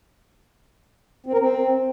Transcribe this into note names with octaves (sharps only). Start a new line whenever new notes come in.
C4
A#4
C4